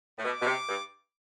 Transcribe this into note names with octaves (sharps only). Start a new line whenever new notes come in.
A2
B2 D6
B2
C3
G2